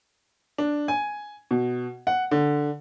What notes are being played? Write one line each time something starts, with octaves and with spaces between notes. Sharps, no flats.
D4
G#5
B2
F#5
D3